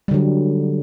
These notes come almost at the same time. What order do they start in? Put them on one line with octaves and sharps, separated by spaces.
G3 D3 F#3